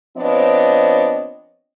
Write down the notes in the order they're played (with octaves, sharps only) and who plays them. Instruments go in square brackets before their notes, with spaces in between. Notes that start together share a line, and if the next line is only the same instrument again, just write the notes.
[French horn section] F3 B3 C4 D4 C#5 D#5